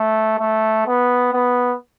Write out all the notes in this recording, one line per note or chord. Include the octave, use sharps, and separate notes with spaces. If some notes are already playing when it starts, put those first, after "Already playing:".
Already playing: A3
A3
B3
B3